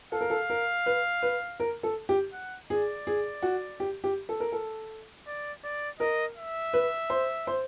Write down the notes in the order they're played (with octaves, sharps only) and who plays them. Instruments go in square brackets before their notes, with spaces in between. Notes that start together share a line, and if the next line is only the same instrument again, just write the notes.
[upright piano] A4 [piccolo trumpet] F5
[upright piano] A#4
A4
A#4
B4
B4
A#4
A4
G4
[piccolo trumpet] F#5
[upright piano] G#4 [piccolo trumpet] D5
[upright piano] G#4
F#4
G4
G4
A4
A#4
A4
[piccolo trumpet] D5
D5
[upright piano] A#4 [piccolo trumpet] D#5
[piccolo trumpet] E5
[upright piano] B4
C5
C5